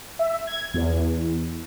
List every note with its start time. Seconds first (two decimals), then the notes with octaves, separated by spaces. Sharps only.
0.19 E5
0.47 G#6
0.74 E2